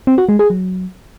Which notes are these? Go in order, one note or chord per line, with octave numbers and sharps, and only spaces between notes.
C4
F#4
G#3
G#4
F#3